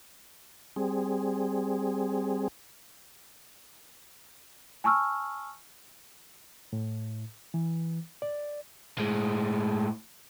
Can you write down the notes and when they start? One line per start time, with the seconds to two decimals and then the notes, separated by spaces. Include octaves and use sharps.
0.76 G3 C4 G#4
4.84 G#5 A5 C#6 E6 F6
6.73 A2
7.54 E3
8.22 D5
8.98 A2 G#3